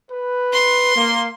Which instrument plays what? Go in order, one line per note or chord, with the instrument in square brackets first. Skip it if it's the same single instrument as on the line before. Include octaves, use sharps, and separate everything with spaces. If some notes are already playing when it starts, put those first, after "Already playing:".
[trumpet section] B4
[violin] C6
[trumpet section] A#3